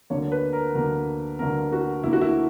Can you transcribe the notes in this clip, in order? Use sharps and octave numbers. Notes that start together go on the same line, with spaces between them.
D2 D3 A#3 C#5
B4
A#4
D2 D3 A#3 A#4
D2 D3 A#3 A#4
F#4
D2 D3 A#3 E4
F#4
E4